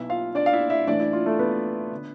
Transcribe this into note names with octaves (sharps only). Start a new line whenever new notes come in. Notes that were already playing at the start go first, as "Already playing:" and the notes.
Already playing: B1 B2 E4 E5
F4 F5
D4 D5
F5
E4 E5
E4 E5
A1 A2 E3 D4 D5
E4
F4
A3 A4
B3 B4
D3